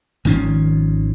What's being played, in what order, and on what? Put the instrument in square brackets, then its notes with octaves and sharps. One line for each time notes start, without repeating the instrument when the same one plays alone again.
[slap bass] G#1 D#3 F3 C#4